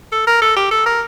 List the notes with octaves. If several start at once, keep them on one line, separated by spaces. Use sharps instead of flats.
A4
A#4
A4
G4
A4
A#4